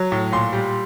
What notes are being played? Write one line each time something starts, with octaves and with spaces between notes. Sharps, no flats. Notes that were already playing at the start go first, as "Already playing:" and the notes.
Already playing: F#3
A2
A#2 C6
G3